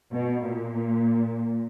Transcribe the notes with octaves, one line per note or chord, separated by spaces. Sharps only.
B2
A#2